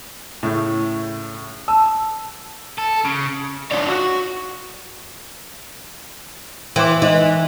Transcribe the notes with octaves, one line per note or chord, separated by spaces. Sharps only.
A2 C#3 A3
A5 E6
A4
C#3
D4 D#4 F4 C#5 D5
F#4
E3 G5 C6 D6
G#2 E3 D#5